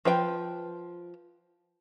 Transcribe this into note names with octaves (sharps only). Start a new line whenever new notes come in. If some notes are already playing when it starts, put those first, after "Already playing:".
F3 B4 G5